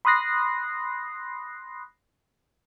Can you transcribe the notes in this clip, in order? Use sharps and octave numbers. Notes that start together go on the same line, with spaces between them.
B5 C6 D#6 F#6 A#6 C7